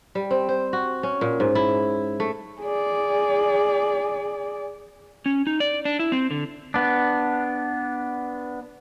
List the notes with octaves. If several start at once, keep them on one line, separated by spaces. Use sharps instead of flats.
G3
C4
C5
F#4
C#4
A#2
G#2
E4
A3
G#4 D5
C#4
D#4
D5
D4
E4
C4
D3
B3 D4